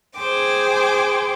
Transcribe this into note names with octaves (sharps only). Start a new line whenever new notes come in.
G#4 C5 G5 D6